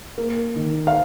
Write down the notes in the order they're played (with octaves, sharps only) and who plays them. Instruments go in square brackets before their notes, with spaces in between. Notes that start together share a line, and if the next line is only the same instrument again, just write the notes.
[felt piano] A#3
D#3
[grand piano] F5